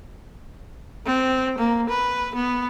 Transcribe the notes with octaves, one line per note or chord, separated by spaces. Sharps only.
C4
A#3
B4
B3